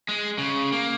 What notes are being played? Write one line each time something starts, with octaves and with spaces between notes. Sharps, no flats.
G#3
C#3
A#3